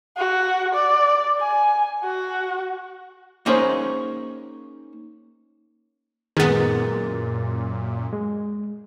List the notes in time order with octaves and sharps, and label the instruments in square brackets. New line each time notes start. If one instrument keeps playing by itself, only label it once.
[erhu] F#4
D5
G#5
F#4
[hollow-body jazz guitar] A#3 C#4 D#4 G#4 C5 C#5
[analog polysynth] F#2 A#2 [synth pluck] D#3 B3 [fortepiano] G#3 [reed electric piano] A#4 A6
[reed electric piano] G#3